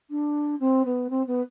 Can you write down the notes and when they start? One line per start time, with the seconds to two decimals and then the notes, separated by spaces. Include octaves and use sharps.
0.10 D4
0.60 C4
0.85 B3
1.10 C4
1.27 B3